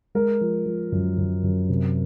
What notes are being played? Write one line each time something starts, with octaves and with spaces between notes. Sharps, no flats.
G#3 A#4
F3
F3
F#2
F#2
F#2
C3